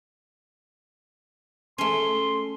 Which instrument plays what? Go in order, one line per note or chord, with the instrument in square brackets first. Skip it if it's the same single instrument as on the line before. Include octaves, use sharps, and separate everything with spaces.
[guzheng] A3 C#4 [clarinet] C6